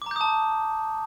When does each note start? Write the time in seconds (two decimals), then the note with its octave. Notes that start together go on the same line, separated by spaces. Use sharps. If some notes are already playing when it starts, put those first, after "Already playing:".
0.02 D6
0.06 A#5
0.11 G6
0.16 D#6
0.21 A5